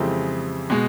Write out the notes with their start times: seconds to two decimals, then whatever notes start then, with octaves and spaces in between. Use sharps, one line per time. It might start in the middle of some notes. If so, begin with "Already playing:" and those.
Already playing: F2 C#3 E3 G#3 C4 G4 A4
0.70 B2 G#3